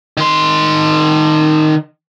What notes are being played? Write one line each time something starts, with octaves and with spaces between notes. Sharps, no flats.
D#3 C6